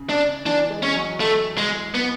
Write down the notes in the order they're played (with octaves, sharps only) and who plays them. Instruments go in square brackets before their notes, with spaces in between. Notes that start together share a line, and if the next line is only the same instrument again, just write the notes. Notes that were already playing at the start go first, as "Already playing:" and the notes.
Already playing: [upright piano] C#3
[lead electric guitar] D4
[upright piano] E3 [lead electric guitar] D4
[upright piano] G#3
[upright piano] G#3 [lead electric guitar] C#4
[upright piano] F#3
[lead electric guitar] A3
G#3
B3